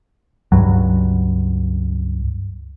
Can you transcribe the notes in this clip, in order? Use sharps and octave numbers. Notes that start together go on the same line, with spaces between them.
C#2 G2 F#3